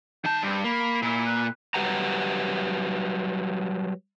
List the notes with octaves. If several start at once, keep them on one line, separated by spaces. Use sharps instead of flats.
D#3 G5 A5
G2 C4
A#3 B5
A#2 E4
B4
F#3 G3 G4 B4 F#5 A#5